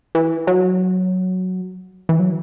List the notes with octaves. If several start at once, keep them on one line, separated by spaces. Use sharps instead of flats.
E3
F#3
E3
F#3